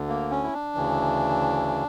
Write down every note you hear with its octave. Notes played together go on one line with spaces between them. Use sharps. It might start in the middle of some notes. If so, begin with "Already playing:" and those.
Already playing: D2 D3
A#3
C#4
E4
D4
D2 C#3 E3